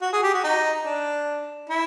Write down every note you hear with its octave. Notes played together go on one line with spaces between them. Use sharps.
F#4
G#4
G4
F#4
D#4
D4
E4